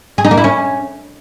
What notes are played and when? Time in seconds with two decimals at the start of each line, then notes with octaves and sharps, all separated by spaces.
0.18 G#4
0.25 D#4
0.31 A#3
0.38 E4
0.44 C#4